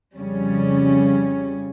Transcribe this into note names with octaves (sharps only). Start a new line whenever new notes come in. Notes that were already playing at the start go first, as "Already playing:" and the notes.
F2 C#3 G3 C#4